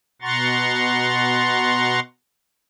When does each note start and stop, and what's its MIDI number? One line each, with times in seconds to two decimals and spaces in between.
0.22 2.00 47
0.22 2.00 78
0.22 2.00 82
0.22 2.00 84
0.22 2.00 85
0.22 2.00 93